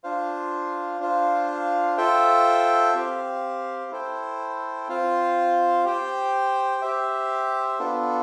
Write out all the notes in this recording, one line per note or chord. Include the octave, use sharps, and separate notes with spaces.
D4 F4 C5 F5
D4 F4 C5 F5
F4 A4 C5 E5 G5
C4 G4 C5 F5
E4 A4 C5 G5
C4 F4 C5 F5
G4 C5 G5
G4 C5 E5
B3 D4 F4 A4